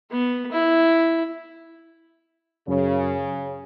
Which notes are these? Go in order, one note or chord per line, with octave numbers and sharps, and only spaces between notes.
B3
E4
F#2 C#3